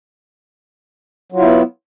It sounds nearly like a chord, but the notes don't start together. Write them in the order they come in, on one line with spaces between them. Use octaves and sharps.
F#3 F4 E4 B3